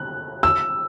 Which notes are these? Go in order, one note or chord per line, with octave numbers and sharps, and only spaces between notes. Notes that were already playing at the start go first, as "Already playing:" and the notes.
Already playing: F#6
E6